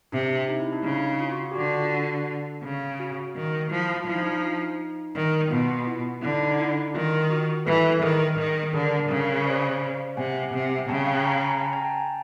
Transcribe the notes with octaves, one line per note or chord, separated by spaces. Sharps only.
C3 D4
D#4
E4
D4
E4
C#3 D#4
F4
F#4
F4
G4
D3 F#4
C#3
F#4
D#3
F3 E4
F3 E4
D#4
D4
D#4
D#3
B2 F4
E4
D3 E4
D#4
D#4
E4
D#3 F4
F#4
E3 A4 B4
D#3 G#4 A#4
D#3
D3 G#4 A#4
C#3 G#4 A#4
C5 D5
C3 F#5 G#5
C3
C#3 G5 A5
F5 G5
G#5 A#5
A5 B5
G#5 A#5
G5 A5
G#5 A#5
G5 A5